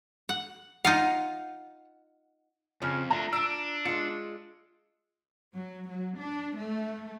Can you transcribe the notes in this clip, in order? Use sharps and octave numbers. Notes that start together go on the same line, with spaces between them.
F#5
D#4 F4 F5 F#5
F2 C#3 F3
A3 D4 F4 A#5
D4 E6 D7
G#3 F4 C#7
F#3
F#3
D4
A3